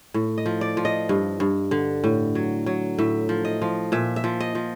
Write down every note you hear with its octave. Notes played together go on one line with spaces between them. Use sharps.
A2
D#5
F3
D5
F3
D#5
G2
G2
D3
A2
F#3
F#3
A2 E5
F3
D#5
F3
A#2 E5
E5
F3
D#5
F3